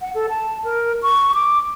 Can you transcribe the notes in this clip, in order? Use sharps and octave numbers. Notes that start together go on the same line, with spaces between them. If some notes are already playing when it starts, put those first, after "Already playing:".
F#5
A4
A5
A#4
C#6
D6